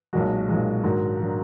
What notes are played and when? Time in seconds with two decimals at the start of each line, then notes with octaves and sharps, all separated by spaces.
0.13 B1 A#2 G#3 F#4 A#4
0.48 B1 A#2 G#3
0.84 G#2 D#3 F#3 D4 F#4 A#4
1.21 D#3 F#3 D4